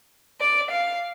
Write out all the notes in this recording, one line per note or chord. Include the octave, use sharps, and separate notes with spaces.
D5
F5